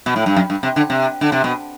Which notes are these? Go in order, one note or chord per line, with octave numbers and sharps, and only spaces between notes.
B2
A2
G2
F#2
G2
C3
D3
C3
D3
C3
B2